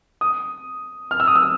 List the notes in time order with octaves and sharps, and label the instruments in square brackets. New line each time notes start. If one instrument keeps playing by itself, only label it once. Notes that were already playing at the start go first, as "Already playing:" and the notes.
[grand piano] D#6
F6
E6
D#6
E6